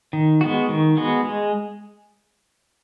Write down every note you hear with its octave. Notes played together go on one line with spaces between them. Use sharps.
D#3
G#3 B3 F#4
D#3
G#3 B3 F#4
G#3